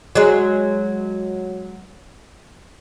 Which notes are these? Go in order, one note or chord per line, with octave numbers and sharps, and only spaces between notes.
F#3 G#3